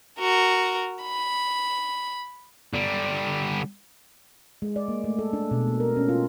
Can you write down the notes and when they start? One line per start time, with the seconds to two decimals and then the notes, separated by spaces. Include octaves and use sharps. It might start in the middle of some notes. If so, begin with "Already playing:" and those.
0.19 F#4 A#4
1.03 B5
2.74 D3 G3
4.62 G#3
4.76 D5
4.88 A#3
5.04 A3
5.19 A4
5.33 D4
5.51 B2
5.67 A#3
5.80 A#4
5.97 C#4
6.09 F4